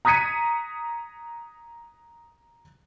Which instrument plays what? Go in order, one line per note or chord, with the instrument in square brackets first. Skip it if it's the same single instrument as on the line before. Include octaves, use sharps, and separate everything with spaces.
[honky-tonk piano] A#5 D#6 G#6 B6 C#7 D#7